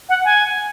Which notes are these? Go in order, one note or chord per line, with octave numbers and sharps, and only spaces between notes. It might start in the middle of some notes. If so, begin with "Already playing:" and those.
F#5
G#5